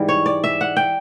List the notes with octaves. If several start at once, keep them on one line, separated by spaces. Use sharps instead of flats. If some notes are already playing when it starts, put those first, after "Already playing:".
Already playing: G#2 E3 G3
C#5
D5
E5
F#5
G5